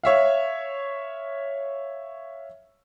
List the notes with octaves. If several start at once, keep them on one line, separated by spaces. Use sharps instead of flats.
C#5 E5 F5